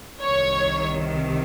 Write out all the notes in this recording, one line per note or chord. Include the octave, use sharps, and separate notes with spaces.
C2 C3 D#3 C#5